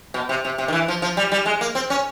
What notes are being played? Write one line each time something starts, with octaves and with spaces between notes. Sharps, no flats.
B2
C3
C3
C3
D#3
E3
F3
F3
G3
G3
G#3
A#3
C4
C#4